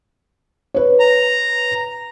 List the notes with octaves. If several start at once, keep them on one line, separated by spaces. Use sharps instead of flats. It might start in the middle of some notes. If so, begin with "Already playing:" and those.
B4 C#5
A#5